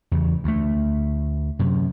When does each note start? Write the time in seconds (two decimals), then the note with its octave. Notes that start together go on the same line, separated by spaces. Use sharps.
0.11 E2 C#3
0.44 D2 A3
1.59 F#2 C3